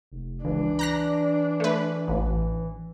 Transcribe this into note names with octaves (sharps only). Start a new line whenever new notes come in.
F1
C#2 E3 D4
A#5 F#6 A#6
A3 B4
A1